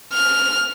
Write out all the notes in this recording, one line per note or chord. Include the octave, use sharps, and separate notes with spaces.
F6